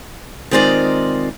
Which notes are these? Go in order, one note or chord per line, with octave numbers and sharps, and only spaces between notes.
D#3 G#3 C4 F4 D5 D#5